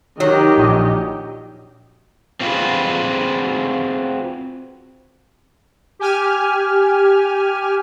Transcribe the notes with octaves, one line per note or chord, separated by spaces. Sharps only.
D#3 F#3 G4 D#5
A#1 D#6
C4 F4 F#4 G#4 B4
G4 G#5 F6